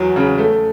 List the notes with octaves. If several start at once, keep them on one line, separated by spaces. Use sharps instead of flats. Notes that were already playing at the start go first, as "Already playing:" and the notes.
Already playing: E2 F#3
C#3
A3